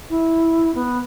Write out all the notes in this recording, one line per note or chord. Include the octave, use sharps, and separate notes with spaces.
E4
B3